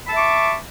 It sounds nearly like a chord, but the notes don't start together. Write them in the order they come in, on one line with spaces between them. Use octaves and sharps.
B5 A5 E5 D6 C#6